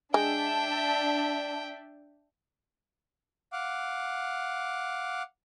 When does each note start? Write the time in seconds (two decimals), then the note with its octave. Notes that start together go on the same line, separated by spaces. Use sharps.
0.14 G#3 D4 E5 G5 A5
3.53 F5 F#5 D6